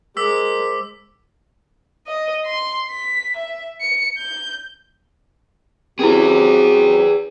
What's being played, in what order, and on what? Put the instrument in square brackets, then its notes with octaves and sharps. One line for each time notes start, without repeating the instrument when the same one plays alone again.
[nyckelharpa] G#3 [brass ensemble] A#4 C5 [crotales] D6 E6 B6
[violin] D#5
C6
B6
E5
C#7
G6
[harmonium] F#3 C4 G4 [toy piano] C#4 E4 [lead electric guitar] G#4 B4